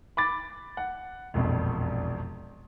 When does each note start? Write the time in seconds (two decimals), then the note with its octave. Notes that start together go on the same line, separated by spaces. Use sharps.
0.17 B5 D6 A6
0.77 F#5
1.34 E1 A#1 F2